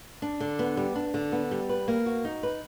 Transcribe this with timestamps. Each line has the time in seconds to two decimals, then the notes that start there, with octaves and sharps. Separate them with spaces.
0.22 D4
0.40 D3
0.59 B3
0.77 G3
0.95 D4
1.14 D3
1.32 B3
1.51 G3
1.69 B4
1.88 A#3
2.06 F#4
2.25 D#4
2.43 B4